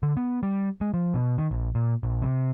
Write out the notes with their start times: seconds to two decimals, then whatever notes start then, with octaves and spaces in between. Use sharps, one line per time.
0.03 D3
0.17 B3
0.43 G3
0.81 G#3
0.94 F3
1.14 B2
1.38 D#3
1.51 A#1
1.75 A#2
2.03 A#1
2.22 C3